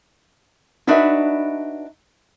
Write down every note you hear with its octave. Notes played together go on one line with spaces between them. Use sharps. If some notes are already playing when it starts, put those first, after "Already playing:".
D4 D#4 F#4 B4 E5